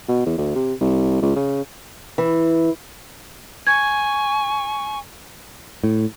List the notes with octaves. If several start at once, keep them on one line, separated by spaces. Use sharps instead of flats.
B2
E2
D2
C3
C2
C#2
C#3
E3
G#5 C#6 G#6
A2